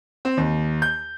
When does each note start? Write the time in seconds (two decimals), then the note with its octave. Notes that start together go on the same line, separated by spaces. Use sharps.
0.25 C4
0.37 D#2
0.82 G6